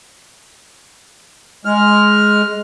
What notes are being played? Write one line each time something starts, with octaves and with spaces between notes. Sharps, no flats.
G#3 F6